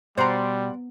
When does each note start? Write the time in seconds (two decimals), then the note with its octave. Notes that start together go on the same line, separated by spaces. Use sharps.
0.18 B2 G3 C5 D5 F#5 A#5 C6